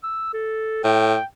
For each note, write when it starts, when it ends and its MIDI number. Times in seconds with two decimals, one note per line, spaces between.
0.03 0.34 88
0.34 0.83 69
0.84 1.16 45
0.84 1.24 79